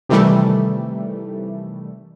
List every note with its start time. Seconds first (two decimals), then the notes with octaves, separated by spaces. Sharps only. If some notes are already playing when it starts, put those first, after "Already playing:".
0.09 C3 D#3 E3 G3 A3